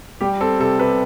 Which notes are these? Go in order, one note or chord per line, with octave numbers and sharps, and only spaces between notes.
G3 G4
C4 A4
C3 A4
C3 B4